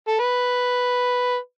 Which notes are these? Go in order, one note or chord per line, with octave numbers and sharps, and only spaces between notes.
A4
B4